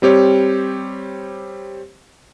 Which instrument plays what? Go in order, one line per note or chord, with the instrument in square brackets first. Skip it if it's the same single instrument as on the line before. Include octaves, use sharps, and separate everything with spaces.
[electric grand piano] G3 C4 G4 C#5